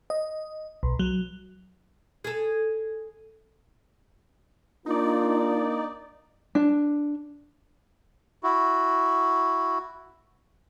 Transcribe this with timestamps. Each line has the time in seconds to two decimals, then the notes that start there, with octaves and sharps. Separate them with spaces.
0.10 D#5
0.83 B1
0.99 F#3
2.24 G#4 A4
4.86 A#3 D4 D#4 F4 D5
6.55 D4
8.43 E4 F#4